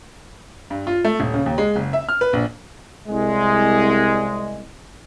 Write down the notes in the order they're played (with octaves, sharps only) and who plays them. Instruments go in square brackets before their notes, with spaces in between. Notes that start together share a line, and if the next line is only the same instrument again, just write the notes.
[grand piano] G2
F4
A3
D#1
C#3
D#2
G#3
F#1
E5
F6
B4
A#1
[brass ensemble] C2 G#3